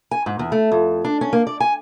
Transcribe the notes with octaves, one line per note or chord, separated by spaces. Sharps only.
G#5
G#2
E2
A3
F2
D4
C#4
A#3
D5
G#5